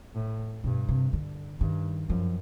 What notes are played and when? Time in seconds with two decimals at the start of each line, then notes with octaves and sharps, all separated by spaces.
0.15 A2
0.64 G2 B2
0.88 C3
1.13 D3
1.60 G2 D#3
2.09 F#2 F3